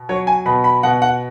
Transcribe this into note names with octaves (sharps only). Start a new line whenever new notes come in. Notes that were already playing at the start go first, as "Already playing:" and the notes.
Already playing: B2
F#3 C#5
G#5
B2 B5
B5
B2 F#5
F#5